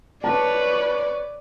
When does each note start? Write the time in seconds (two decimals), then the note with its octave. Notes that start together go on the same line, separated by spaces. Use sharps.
0.24 B4 C#5 D5 A5